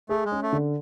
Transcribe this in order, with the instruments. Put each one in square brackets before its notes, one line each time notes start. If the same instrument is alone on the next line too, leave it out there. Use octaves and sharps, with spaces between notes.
[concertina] A3 [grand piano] G#4
[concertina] G#3
[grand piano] C#4
[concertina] A3
[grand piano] D3